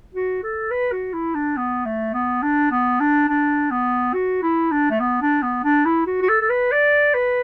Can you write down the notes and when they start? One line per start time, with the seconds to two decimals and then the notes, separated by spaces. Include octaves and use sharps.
0.14 F#4
0.43 A4
0.71 B4
0.92 F#4
1.13 E4
1.35 D4
1.57 B3
1.85 A3
2.14 B3
2.43 D4
2.72 B3
3.00 D4
3.29 D4
3.71 B3
4.14 F#4
4.43 E4
4.71 D4
4.91 A3
5.00 B3
5.22 D4
5.42 B3
5.64 D4
5.85 E4
6.06 F#4
6.22 F#4
6.29 A4
6.41 A4
6.50 B4
6.72 D5
7.14 B4